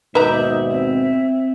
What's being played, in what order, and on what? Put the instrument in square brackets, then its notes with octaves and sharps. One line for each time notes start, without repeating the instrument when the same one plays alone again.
[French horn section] D#2 G#2 B2 [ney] D#4 [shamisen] B4 A#5 [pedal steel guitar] D5 E5
[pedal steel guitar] C4 [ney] E5